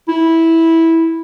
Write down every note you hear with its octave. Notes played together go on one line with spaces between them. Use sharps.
E4